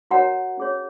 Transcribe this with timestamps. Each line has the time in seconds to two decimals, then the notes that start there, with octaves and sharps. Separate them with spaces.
0.11 F#4 A#4 C#5 F#5 A#5
0.57 C#4 G#4 C#5